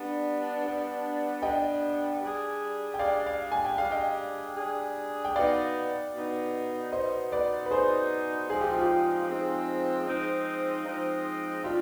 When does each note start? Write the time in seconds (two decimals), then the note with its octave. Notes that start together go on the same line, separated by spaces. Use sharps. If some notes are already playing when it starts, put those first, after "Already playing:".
Already playing: G3 B3 D4
0.65 G3 B3 D4
1.42 G3 B3 D4 D#5 G5
2.22 G3 D4 G#4
2.94 G5
2.99 G3 D4 G#4 D5 F5
3.26 D5 F5
3.52 G#5
3.65 G5
3.78 G3 D4 G#4 F5
3.91 D#5 G5
4.57 G3 D4 G#4
5.25 G5
5.35 B2 B3 D#4 D5 F5
6.14 B2 B3 D#4
6.92 B2 B3 D#4 C5 D#5
7.32 B4 D5
7.66 B4
7.71 B2 B3 D#4 G#4 C5
8.49 F3 G#3 C4 D#4 G#4
8.61 G4
8.72 F4
8.81 G4
9.28 F3 G#3 C4 D#4
10.07 F3 G#3 C4 D#4
10.85 F3 G#3 C4 D#4
11.63 G3 D4 F4 G4